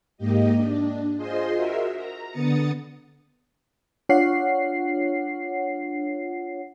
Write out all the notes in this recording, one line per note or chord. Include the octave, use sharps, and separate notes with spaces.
G#2 A#3 G4 D#5
D4
F4 G#4 C5 D#5 C6
F#4 A#4 E5
A#5
D3 B3 D#6 A6 C#7
D4 F4 C#5 F#5 C7